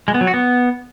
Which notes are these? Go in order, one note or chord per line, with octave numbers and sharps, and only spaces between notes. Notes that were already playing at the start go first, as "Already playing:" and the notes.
G#3
B3
F#3
F#4
B3